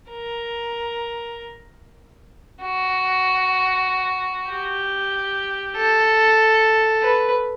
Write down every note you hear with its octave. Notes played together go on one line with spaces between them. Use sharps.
A#4
F#4
G4
A4
B4